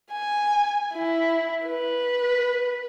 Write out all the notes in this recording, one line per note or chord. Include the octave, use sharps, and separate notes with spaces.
G#5
E4
B4